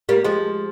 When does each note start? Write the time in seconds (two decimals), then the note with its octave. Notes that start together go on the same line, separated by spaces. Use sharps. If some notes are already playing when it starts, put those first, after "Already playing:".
0.09 G3 A#3
0.25 F3 G#3